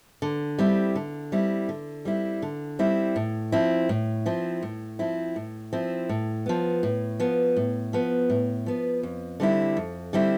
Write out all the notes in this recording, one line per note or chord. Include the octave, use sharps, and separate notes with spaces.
D3
G3 C4 E4
D3
G3 C4 E4
D3
G3 C4 E4
D3
G3 C4 E4
A2
F3 C4 E4
A2
F3 C4 E4
A2
F3 C4 E4
A2
F3 C4 E4
A2
F3 B3
A2
F3 B3
A2
F3 B3
A2
F3 B3
F2
D3 G3 C4 E4
F2
D3 G3 C4 E4